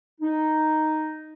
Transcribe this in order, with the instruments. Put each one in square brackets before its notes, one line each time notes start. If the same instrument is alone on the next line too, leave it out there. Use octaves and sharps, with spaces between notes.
[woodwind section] D#4